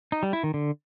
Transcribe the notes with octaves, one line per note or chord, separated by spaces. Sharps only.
D#4
G3
E4
D#3
D3